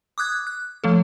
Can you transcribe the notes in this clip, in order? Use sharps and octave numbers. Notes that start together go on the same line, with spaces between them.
D6 D#6 F#6 G#6
F#6
F3 A3 A4